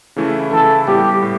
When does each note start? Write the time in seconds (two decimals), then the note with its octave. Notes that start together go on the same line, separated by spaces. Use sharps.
0.16 C#3 E3 A3 E4
0.52 C#3 E3 A3 E4 A4
0.87 A2 G3 B3 G4
1.22 A2